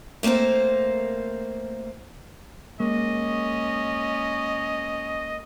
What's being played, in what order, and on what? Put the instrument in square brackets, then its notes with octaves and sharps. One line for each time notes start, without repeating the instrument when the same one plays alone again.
[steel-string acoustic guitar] A3 A#3 C4 A#4 C5
[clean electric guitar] G#3 A#3 [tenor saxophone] C#4 [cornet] D#5